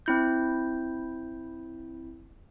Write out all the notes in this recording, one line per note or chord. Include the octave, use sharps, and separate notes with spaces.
C4 E4 G6